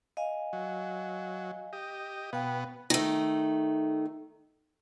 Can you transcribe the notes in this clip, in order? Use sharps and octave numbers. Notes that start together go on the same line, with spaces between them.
D#5 F5 G#5
F#3
G4 D#5
B2 B3 F5 G5
D#3 A3